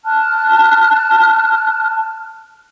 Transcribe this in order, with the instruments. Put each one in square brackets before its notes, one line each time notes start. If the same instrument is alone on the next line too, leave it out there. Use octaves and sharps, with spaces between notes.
[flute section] A5 F6 F#6